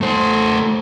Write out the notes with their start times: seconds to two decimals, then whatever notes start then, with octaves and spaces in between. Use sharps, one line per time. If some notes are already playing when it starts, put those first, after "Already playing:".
0.01 A3 C5